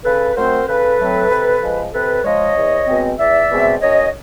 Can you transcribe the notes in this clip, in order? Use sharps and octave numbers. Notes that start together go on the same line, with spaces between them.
C#3 A4 B4
F#3 A3 C4 A#4 C5
C#3 A4 B4
F#3 A3 C4
C3
F3 G#3
C3 A4 B4
F3 G#3 C#5 D#5
E2
B2 G#3 C4
E2 D5 E5
B2 G#3 C4
F#2 C#5 D#5